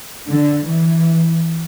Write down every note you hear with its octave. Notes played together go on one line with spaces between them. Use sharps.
D3
E3